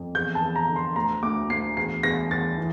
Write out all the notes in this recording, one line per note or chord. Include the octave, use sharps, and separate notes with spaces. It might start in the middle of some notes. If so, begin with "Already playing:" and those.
Already playing: F2
E2 G6
A5
E2
A#5
D3
C6
D2 A#5
D2 D6
D2 C7
E2 C7
E2 A#6
E2 A6
E3